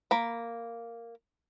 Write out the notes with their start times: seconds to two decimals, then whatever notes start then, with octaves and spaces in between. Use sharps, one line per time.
0.11 A#3 B5